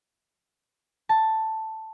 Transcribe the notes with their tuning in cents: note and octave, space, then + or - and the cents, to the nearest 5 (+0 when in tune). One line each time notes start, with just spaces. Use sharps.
A5 +5